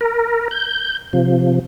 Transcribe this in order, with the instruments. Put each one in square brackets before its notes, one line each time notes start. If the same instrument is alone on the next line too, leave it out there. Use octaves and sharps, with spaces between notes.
[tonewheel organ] A#4
G6
C3 F3